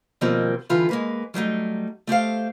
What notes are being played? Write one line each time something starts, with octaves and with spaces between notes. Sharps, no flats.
B2 D#3 F3 G3 A#3 C4
D3 E3 G3 F4 G4 B4
G#3 A#3 B4
F#3 G3 A3 D#4
A3 G4 C5 F5